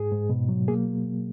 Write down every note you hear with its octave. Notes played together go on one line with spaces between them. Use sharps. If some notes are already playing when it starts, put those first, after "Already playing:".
Already playing: G#2 G#4
G#2
B2
F#3
A#3 G#4